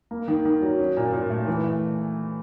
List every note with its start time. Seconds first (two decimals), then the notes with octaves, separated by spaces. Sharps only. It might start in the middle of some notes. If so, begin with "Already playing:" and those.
0.11 A#3
0.28 D#3
0.45 D#3
0.62 F#3
0.79 C#4
0.97 A#2
1.13 A#2
1.30 A3
1.47 E3
1.64 A3